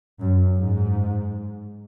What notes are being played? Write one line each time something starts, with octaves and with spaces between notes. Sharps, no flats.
F#2
G#2